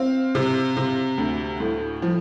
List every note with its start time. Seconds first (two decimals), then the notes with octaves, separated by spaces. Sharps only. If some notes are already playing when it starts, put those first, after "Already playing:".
Already playing: C4 F5
0.35 C3
0.77 C3
1.18 D2
1.60 A2
2.02 F3